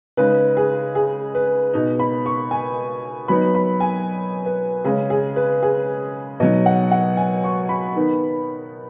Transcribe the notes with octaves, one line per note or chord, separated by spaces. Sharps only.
C#3 G#3 D#4 B4
G#4
G#4
B4
B2 B3 D#4
B5
C#6
G#5
F#3 B3 D#4 B5
B5
G#5
B4
C#3 G#3 C#4 G#4
G#4
B4
G#4
B2 F#3 D#4 D#5
F#5
F#5
G#5
C#6
B5
D#3 B3 D#4